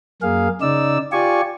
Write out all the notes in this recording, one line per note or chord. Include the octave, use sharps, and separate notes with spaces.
F#2 A#3 G#4 F5
C#3 D#4 D5 E6
F4 G4 D5 G#5 C#6